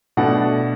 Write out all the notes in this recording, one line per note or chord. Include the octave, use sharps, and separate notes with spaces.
B2 A3 D4 F#5